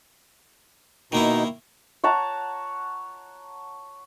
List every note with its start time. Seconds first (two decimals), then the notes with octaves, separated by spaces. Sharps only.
1.12 B2 D#3 A#3 D#4 E4
2.04 C#5 F#5 A5 A#5